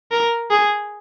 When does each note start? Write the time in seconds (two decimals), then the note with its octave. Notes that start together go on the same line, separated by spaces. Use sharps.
0.11 A#4
0.51 G#4